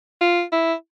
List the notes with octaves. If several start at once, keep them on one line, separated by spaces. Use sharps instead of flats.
F4
E4